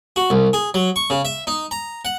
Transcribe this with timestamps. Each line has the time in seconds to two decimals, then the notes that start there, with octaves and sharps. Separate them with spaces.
0.16 F#4
0.30 C2
0.53 G#4
0.74 F#3
0.96 C#6
1.10 C#3
1.25 E5
1.47 D#4
1.71 A#5
2.05 F#5